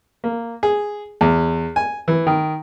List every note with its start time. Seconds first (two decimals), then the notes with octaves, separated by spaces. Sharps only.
0.24 A#3
0.63 G#4
1.21 E2
1.76 G#5
2.08 E3
2.27 D#3